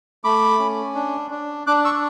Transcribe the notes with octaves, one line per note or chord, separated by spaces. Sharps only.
A3 B5 D6
C#4
D4
D4
D4 D6 F#6
C#6 E6